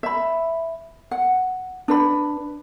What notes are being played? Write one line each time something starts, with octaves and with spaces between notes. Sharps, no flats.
E5 B5
F#5
D4 B4 B5